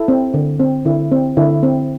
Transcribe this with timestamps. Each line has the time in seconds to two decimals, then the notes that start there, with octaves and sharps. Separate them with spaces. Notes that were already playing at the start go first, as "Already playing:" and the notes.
Already playing: E4 A4
0.08 C4
0.34 D3
0.60 C4
0.85 D3 E4
1.11 C4
1.37 D3 E4
1.63 C4